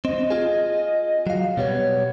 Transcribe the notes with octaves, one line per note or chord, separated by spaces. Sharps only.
C4 D#5
F4 G#4
F#3 F5
B2 G3 B3 C#5